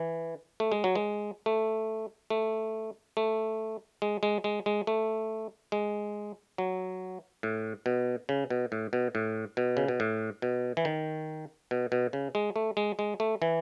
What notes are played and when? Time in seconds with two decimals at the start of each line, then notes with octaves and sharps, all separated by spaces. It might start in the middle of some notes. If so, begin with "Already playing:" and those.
Already playing: E3
0.60 A3
0.72 G#3
0.84 F#3
0.95 G#3
1.46 A3
2.30 A3
3.17 A3
4.02 G#3
4.23 G#3
4.44 G#3
4.66 G#3
4.87 A3
5.72 G#3
6.58 F#3
7.43 A2
7.86 B2
8.29 C#3
8.50 B2
8.72 A2
8.93 B2
9.15 A2
9.57 B2
9.77 C#3
9.88 B2
10.00 A2
10.42 B2
10.77 E3
10.85 D#3
11.71 B2
11.92 B2
12.13 C#3
12.35 G#3
12.56 A3
12.77 G#3
12.99 G#3
13.20 A3
13.42 E3